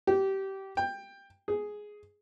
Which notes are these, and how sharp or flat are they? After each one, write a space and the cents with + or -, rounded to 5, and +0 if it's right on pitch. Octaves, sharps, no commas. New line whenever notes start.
G4 -20
G5 +15
G#4 +5